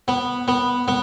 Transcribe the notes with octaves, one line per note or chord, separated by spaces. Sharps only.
B3
B3
B3